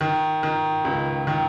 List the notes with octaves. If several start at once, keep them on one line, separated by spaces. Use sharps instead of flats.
D#3
D#3
C#2
D#3